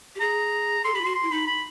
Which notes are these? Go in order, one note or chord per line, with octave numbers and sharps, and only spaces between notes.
G4
G#4 A#5
A4 C6
G4 B5
F4
F#4 C6
C6
E4
D#4 B5
B5